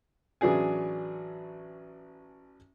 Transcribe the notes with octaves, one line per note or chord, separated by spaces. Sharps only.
A1 E3 F#3 D4 G#4 G#5